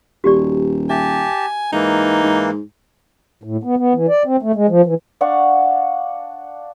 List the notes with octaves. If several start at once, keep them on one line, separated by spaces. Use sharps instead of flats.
D#1 F#4 G4 D5
G4 E5 G#5 A5
G#2 E3 A#3 D#4
G#2
A2
B3
B3
E3
D5
C4
A3
G#3
F3
E3
D4 F5 F#5 C#6